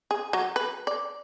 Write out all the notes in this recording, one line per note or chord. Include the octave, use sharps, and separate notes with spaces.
G#4
F#3
B4
D5